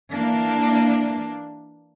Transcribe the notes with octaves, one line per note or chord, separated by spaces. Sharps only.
E3 A#3 D4